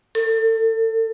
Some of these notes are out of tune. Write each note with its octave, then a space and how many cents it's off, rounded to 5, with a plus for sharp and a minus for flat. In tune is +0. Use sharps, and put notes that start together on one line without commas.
A4 +30